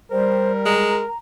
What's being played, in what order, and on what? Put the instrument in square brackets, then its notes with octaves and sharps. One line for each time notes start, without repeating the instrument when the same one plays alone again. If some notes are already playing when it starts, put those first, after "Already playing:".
[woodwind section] G3 [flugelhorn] A#4 [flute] C5
[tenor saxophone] G#3 [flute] A#5